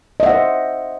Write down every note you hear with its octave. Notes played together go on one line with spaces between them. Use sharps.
C5 D#5 E5 F#5